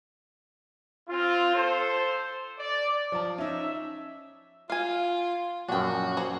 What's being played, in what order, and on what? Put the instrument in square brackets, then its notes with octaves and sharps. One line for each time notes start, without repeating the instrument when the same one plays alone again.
[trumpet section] C4 F4
A4 C5
D5
[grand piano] F3 A5
[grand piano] C#4 D#4 [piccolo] E5
[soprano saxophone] F4 [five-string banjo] F5 G#5
[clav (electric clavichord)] A#1 F#2 [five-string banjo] D4 G5 [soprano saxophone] F#4
[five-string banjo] A#3 G#4 C5